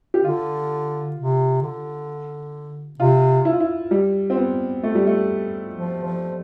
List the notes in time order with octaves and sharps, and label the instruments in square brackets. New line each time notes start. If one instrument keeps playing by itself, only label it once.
[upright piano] G4
[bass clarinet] D3 [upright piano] F4
[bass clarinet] C3
D3
[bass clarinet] C3 [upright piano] F4
[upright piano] E4
F4
E4
G3
C4
B3
A3
G3
A3
[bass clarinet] F3
F3